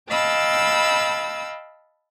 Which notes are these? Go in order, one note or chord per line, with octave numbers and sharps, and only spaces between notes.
D#5 F5 G5 A5 B5 E6